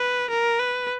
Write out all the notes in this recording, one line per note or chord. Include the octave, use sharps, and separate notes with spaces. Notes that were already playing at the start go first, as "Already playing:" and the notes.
Already playing: B4
A#4
B4